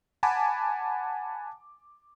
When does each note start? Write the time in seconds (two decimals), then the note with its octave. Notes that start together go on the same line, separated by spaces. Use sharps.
0.23 F#5 G#5 A5 B5 D6